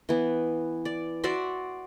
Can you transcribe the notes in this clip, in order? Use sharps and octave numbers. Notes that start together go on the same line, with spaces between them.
E3 B3
D5
F#4 D5 E5 C6